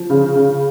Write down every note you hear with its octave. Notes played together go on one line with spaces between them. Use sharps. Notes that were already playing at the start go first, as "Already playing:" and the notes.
Already playing: F3
C#3
C#3